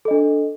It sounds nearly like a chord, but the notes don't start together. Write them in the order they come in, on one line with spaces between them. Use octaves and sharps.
A4 D#5 D4